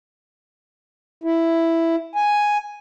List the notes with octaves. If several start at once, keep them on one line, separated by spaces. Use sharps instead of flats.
E4
G#5